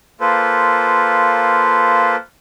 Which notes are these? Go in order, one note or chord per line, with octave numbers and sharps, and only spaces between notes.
A#3 F4 A4 B4 C5